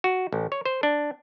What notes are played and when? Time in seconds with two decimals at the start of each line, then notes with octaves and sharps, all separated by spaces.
0.04 F#4
0.32 A1
0.52 C#5
0.66 C5
0.83 D4